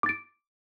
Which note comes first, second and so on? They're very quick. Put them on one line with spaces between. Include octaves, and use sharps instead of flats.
D6 A6 D7